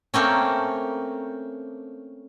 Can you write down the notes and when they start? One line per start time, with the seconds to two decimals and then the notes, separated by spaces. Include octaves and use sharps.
0.14 A3 A#3 C4 C#4